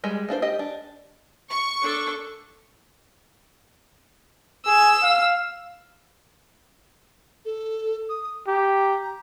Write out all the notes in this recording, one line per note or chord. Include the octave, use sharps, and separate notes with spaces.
G3 G#3
A#3 D4 F4 C5
G4 D#5
D4
C#6
D4 A4
G#4 E6
F5
A4
D#6
G4 A#5